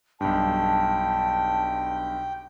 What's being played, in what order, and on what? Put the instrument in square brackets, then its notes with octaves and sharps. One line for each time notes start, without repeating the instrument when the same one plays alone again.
[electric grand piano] B1 G2 [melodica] G5 [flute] A5